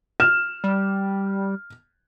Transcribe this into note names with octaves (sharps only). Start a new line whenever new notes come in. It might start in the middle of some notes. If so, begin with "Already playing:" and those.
F6 E7
G3